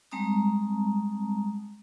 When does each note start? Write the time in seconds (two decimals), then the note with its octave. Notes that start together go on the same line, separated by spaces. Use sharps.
0.12 G3 G#3 C4 A5 A#5 D#6